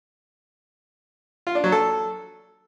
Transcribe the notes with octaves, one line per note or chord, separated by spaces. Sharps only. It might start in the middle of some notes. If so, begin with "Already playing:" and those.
F4
D4
F#3
A4